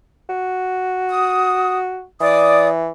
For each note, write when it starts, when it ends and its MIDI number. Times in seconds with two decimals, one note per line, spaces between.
0.29 2.04 66
1.10 1.77 87
2.20 2.90 52
2.20 2.68 74
2.20 2.68 87